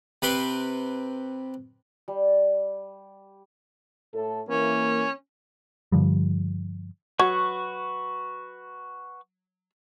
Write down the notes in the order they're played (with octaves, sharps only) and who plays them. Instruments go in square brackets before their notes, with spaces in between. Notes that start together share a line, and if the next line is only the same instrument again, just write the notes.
[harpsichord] C3 B4 C6 D6
[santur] G3
[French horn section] A2 A4
[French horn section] E3 A#3 [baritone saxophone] C#4
[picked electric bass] G2 D3 F3 G3
[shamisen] F#3 [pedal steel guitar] F#4 B4 C#6